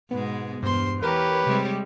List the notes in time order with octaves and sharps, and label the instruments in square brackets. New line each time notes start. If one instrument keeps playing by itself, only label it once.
[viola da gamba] G#2 B2 G#3 [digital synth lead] B3
[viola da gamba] E2 [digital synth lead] G2 [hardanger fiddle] C5 C6
[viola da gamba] E3 [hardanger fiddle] G4 C#5 [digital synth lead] A#4 [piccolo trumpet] B4
[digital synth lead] C3 [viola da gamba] G3 G#3 C4